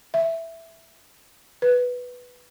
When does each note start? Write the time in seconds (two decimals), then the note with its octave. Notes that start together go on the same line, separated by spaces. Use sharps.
0.14 E5
1.62 B4